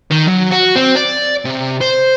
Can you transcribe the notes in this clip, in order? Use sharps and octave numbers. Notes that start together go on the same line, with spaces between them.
D#3
F#3
F#4
C4
D5
C3
C5